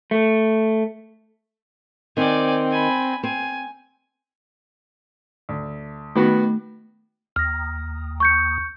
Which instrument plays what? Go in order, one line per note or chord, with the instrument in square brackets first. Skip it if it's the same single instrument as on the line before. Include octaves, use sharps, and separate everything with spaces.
[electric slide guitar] A3
[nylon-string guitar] D#3 [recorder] C4 [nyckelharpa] D5 G#5
[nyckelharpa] G#5 B5
[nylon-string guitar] C4 [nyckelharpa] G#5
[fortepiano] D2
[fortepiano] D#3 B3 F#4 [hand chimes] A3
[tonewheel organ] D#2 [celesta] F6 A#6
[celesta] C#6 G6 C#7